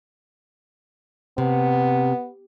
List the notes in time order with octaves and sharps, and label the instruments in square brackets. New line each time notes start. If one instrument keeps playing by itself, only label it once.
[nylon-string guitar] C3 [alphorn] B3